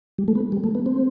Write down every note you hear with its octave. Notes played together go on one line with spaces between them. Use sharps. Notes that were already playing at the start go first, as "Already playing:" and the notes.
G3
A3
B3
G3
A3
B3
C4